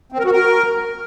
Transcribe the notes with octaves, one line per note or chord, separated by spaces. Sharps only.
C4
A#4
F#4
A#4